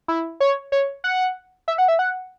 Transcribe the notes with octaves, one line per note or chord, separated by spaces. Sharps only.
E4
C#5
C#5
F#5
E5
F#5
E5
F#5